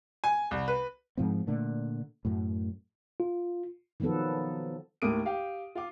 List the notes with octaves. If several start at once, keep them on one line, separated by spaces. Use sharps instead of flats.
G#5
C2
B4
G#2 F3 C4
A#2 D3 A3
F#2 A2
F4
D#3 F3 F#3 B3 A4
D#2 A2 A#4 D6 D#6 D7
G4 F5 G5 D6
F4 F5 D6